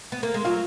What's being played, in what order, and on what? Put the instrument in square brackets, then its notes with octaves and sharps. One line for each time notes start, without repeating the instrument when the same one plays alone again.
[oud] B3
A#3
G#3
[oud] F#3 [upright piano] F4